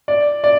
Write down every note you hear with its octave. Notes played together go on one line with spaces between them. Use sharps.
D5
D5